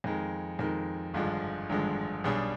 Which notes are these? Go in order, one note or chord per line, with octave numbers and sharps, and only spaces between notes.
F2 D#3 G#3
F2 D#3 G#3
G#1 G2 D3 F3 G#3
G#1 G2 D3 F3 G#3
B1 B2 G3 D4 G#4